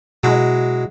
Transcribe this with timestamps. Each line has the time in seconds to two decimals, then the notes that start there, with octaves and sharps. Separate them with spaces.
0.24 B2 F#3 G#3 E4